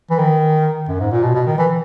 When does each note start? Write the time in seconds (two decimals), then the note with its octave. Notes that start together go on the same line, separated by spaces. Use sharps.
0.11 E3
0.19 D#3
0.89 F#2
1.00 G#2
1.12 A#2
1.23 B2
1.35 B2
1.47 D#3
1.58 E3